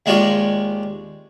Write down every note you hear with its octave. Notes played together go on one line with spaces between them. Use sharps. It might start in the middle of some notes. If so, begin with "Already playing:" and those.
D#2 G#3 D4 F4 C#5 D5